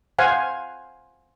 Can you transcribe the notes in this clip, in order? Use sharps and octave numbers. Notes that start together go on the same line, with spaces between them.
C5 F5 F#5 G#5